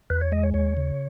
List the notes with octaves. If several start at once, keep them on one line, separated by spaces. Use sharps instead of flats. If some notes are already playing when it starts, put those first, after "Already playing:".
E2 B4
C#5
G#3 D#5
C#5
D#2 C#5
C#3